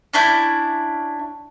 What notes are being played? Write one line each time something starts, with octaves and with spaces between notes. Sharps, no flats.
C#4 D4 E4 G6